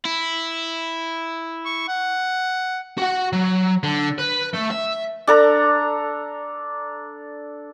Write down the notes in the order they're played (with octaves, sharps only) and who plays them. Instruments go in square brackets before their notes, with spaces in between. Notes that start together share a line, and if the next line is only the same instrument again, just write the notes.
[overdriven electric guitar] E4
[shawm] C#6
F#5
[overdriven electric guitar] F#4 F#5
F#3
D3
B4
A3
E5
[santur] D4 A4 A#5